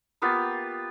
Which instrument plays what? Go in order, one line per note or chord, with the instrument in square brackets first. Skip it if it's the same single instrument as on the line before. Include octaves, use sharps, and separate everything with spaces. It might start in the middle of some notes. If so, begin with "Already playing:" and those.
[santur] A#3 B3 F4 G4